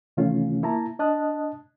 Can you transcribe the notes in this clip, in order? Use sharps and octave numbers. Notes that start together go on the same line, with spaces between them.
C3 D#3 E3 A3 C#4 F4
A#3 E4 A5 A#5
D4 D#5 A5 D#6 F#6